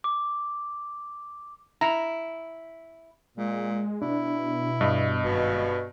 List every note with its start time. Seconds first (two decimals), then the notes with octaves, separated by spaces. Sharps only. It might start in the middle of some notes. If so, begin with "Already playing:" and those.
0.04 D6
1.81 E4 A#5
3.37 A#2 G#3
4.02 B2 D4 E4
4.81 G2 D#5
5.23 G#1 B2